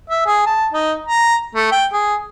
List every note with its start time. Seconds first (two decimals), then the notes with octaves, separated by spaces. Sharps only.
0.10 E5
0.26 G#4
0.46 A5
0.73 D#4
1.06 A#5
1.55 A3
1.72 G5
1.93 G#4